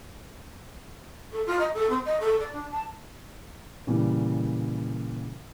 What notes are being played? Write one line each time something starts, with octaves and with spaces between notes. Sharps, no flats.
A4
F4
D#5
A4
C4
D#5
A4
D5
D4
A5
A#2 C#3 E3 G3